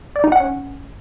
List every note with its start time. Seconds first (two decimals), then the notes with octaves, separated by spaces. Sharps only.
0.16 D5
0.24 D#4
0.32 F#5
0.40 C#4